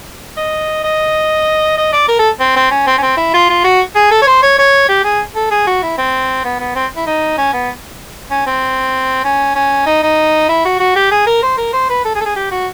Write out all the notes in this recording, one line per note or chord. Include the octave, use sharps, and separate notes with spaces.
D#5
D#5
D#5
D5
A#4
A4
C4
C4
C#4
C4
C#4
C4
E4
F4
F4
F#4
G#4
A4
C#5
C5
C#5
C#5
G4
G#4
A4
G#4
F#4
E4
C4
B3
B3
C4
E4
D#4
C#4
B3
C#4
C4
C#4
C#4
D#4
D#4
E4
F#4
F#4
G4
G#4
A#4
C5
A#4
C5
B4
A4
G#4
A4
G#4
G4
F#4